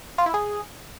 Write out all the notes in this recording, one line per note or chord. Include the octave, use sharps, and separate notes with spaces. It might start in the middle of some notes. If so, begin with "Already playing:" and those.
F4
E4
G#4